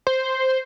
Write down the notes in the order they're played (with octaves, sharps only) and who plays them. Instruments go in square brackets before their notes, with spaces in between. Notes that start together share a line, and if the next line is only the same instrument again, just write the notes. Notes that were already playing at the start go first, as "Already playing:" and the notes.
[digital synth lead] C5